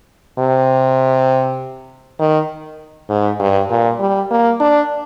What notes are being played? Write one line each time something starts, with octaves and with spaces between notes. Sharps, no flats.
C3
D#3
G#2
G2
A#2
G3
A#3
D4